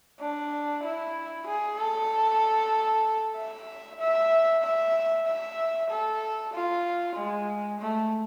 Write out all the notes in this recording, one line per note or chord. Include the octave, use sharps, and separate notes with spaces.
D4
E4
G#4
A4
E5
E5
E5
E5
A4
F4
G#3
A3